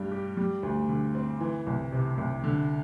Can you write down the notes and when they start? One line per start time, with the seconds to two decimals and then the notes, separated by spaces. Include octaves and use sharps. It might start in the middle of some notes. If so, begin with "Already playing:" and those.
Already playing: G2 G3 D4
0.12 G4
0.37 G3
0.63 D2
0.89 D3
1.15 C4
1.41 E3
1.67 C2
1.92 C3
2.18 C2
2.44 D3